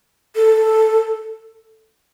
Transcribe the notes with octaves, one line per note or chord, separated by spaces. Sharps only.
A4